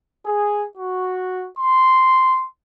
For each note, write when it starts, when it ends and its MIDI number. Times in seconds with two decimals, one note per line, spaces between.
0.24 0.65 68
0.78 1.46 66
1.58 2.43 84